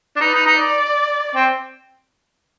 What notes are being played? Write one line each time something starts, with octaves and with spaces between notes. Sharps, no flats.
D4
D#4 B4
D#4
D#4
D5
C4